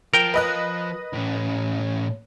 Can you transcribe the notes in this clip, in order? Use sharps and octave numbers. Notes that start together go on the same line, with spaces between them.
F3 A#4 G5
B4 D#5 F#6
A2 C#4